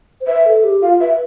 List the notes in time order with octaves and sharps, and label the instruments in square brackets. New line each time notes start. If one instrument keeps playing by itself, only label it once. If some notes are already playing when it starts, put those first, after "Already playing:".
[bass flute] C5
[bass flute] B4 [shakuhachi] E5
[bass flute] A4
G4
[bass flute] F4 [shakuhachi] F5
[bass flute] B4 [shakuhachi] E5